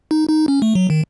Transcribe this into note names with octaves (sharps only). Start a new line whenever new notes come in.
D#4
D#4
C#4
A3
F#3
D#3